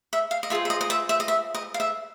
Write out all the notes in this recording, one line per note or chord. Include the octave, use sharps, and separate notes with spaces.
E5
F5
D#5
F4 G#4 C5 E5
E5
D#5
D#5
E5
E5
D#5
E5
D#5
F5
E5